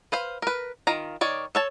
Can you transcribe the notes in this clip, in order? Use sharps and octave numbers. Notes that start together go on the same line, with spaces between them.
B4 C5 F5
A#4 B4
D#3 F4 A#5
D#3 C#5 D5
A4 C#5 A5